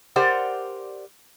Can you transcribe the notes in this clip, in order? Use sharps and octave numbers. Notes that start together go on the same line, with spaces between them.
G4 A#4 C5 D5 F#5